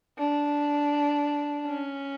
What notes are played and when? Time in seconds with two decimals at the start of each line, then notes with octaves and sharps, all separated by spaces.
0.19 D4
1.67 C#4